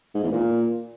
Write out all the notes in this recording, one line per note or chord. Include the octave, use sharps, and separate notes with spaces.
G#2
E2
A#2